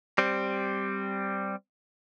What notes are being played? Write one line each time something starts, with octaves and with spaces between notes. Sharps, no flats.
G3 C4